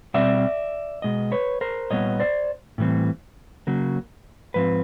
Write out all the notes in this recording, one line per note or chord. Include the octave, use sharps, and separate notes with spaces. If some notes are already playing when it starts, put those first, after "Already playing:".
B2 G3 C4 D5 E5
B2 G#3 D#5
B4 C#5
A#4 C5
A#2 G3 B3 C#5 D#5
C5 D5
A2 E3 G3 C4
C#3 F#3 A#3
G#2 F3 C4 B4